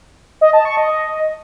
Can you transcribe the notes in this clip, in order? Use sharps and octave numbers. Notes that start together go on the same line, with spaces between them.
D#5
A5
C#6
D#5